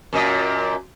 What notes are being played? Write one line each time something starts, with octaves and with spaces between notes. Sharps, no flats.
F#2 A#2 D#5